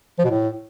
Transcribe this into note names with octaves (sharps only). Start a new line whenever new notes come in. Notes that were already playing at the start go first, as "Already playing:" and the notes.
F3
B2
A2